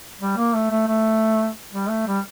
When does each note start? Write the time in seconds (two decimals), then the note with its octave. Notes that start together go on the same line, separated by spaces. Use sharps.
0.21 G3
0.37 A#3
0.54 A3
0.71 A3
0.88 A3
1.73 G3
1.89 A3
2.07 G3